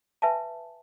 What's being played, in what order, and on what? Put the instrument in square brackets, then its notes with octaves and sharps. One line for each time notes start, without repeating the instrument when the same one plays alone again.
[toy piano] B4 E5 G#5 A5